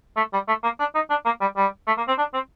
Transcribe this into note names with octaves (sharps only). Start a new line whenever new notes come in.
A3
G3
A3
A#3
D4
D#4
D4
A#3
G3
G3
A3
A#3
C4
D4
C4